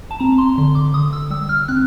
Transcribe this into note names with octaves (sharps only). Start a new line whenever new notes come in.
A5
C4 A#5
C6
D3 C6
D6
D3 D#6
E6
G3 E6
F6
C4 F#6